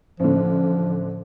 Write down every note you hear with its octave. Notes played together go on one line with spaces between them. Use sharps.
A1 D3 F3